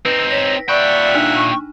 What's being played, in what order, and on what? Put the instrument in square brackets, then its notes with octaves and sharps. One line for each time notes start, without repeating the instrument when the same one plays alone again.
[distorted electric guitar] C4 D#4 [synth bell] B4
[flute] C#5 [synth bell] A#6 B6
[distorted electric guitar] A#2 G5 [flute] D5 [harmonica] E5 F#5 [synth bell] B5 C#6
[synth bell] D4 D#4
[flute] C#6